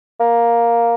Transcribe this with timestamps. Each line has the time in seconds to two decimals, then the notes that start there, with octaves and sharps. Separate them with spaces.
0.20 A#3